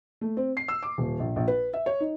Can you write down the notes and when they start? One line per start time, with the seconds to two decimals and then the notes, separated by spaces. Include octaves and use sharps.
0.21 A3
0.37 C4
0.57 C7
0.68 E6
0.83 D6
0.98 D#1
1.19 A#1
1.36 A#1
1.48 B4
1.73 E5
1.86 C#5
2.00 D#4